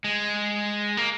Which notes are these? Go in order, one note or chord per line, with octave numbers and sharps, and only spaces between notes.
G#3
A#3